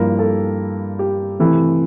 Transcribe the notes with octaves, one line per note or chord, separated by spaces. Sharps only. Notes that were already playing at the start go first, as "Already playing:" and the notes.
Already playing: G2 F3 A#3 E4 A#4
A4
G4
C3 E3 A3 E4